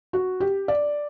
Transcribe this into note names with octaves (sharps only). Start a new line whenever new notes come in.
F#4
G4
D5